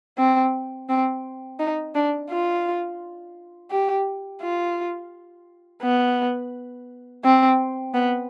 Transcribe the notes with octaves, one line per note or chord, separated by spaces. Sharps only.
C4
C4
D#4
D4
F4
G4
F4
B3
C4
B3